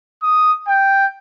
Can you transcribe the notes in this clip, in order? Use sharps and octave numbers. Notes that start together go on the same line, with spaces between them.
D#6
G5